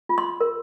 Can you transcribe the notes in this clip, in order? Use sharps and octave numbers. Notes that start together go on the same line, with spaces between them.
F4
C6
A#4